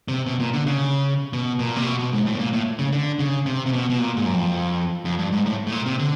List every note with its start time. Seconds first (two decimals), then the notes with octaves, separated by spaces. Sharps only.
0.08 C3
0.26 B2
0.40 A#2
0.53 D3
0.66 C#3
1.33 B2
1.59 A#2
1.76 C3
1.86 B2
1.99 B2
2.13 G#2
2.26 A2
2.35 B2
2.39 A#2
2.53 A2
2.79 C#3
2.93 D3
3.19 C#3
3.46 C3
3.66 C3
3.72 B2
3.90 B2
3.99 A#2
4.17 G#2
4.25 F#2
4.34 F2
5.05 F2
5.19 G2
5.32 G#2
5.46 A2
5.67 A2
5.72 A#2
5.86 C3
5.99 D3